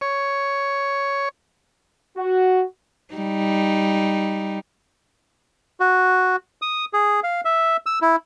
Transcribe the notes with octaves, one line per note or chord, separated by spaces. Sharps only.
C#5
F#4
G3 D#4
F#4
D#6
G#4
F5
E5
E6
E4